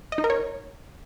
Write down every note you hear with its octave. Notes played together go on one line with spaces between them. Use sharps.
D#5
D#4
A#4
C#5